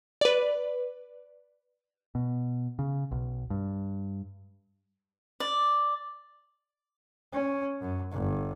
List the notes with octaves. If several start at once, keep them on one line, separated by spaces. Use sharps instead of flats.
B4 D5
B2
C#3
B1
G2
D5
C#4
F#2
G1